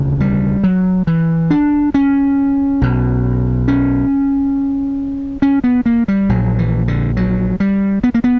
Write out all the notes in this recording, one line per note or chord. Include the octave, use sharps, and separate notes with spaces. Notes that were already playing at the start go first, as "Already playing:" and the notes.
Already playing: E1 D2 C#3
G3
F#3
E3
D4
C#4
B1 B2
C#4
C#4
B3
A#3
G3
A#1 A#2 F#3
E3
D3
F#3
G3
B3
A#3
B3